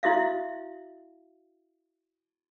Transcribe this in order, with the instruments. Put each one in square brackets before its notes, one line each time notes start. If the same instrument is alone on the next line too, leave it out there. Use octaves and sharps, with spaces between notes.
[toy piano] E4 F#4 E5 F5